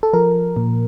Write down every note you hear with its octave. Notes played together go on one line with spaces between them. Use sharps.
A4
F3 A#4
A#2